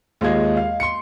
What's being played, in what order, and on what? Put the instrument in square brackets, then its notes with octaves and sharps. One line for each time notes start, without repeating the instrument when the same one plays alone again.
[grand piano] D#2 G#3 F4 D#5 G#6
F5
C6 C#7